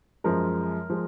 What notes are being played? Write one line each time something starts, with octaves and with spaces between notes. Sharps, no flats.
F#2 F3 G#3 A#4
F3 G#3